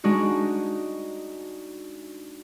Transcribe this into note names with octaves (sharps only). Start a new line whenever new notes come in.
G#3 D4 D#4 F#4